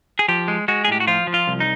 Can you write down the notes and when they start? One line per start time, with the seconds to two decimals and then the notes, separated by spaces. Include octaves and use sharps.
0.19 G#4
0.28 F3 G4
0.48 G#3
0.68 G#3 F#4
0.85 G#4
0.88 A2 G4
1.00 F#4
1.07 F3 F4
1.27 F3
1.34 F4
1.47 C2
1.60 D#4